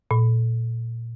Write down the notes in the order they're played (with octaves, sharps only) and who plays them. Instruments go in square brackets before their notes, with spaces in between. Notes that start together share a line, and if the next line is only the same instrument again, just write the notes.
[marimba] A#2